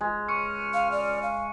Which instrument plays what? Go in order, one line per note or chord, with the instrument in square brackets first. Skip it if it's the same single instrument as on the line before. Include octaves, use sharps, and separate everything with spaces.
[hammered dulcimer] G#3
[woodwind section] C#2 F6 [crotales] C#6 C#7
[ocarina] F5
D5
F5